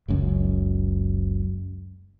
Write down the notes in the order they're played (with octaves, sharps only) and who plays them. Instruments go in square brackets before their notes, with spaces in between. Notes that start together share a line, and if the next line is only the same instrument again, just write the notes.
[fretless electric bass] F#1 C#2 F#2